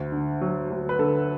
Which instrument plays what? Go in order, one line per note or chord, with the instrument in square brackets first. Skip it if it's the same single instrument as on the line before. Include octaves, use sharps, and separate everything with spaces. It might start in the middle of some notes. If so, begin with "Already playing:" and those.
Already playing: [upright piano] D2
D3
F#3
D2
B4
D3 A4